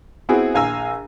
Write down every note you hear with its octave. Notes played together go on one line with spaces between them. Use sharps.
B3 C4 E4 F#4 G#4
A#1 F5 G#5 A#5 E6